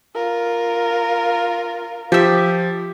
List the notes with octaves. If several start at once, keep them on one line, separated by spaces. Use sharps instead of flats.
F4 A#4
F3 G4 E5